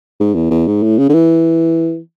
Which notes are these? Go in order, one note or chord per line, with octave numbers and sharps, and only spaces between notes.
G#2
E2
E2
G#2
A2
C#3
D3
E3